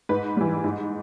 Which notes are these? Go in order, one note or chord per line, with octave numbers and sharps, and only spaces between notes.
G#2 B4
E3 G3
G#2